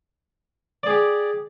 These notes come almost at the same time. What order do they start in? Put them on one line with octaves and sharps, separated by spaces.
D5 G#4 G4